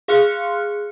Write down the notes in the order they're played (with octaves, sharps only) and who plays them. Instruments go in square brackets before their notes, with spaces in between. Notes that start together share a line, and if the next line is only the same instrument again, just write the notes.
[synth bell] G#4 F5 C6 F6 F#6 C#7